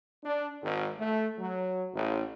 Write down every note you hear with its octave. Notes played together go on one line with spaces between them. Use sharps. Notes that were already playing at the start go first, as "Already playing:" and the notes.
D4
G#1
A3
F#3
A1